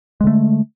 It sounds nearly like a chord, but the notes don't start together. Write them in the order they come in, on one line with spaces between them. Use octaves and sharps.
G#3 D3 A3